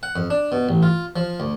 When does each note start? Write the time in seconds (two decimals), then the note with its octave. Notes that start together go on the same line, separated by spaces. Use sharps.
0.03 F#5
0.16 F2
0.30 D4
0.52 B2
0.69 A1
0.83 F4
1.16 F3
1.40 D2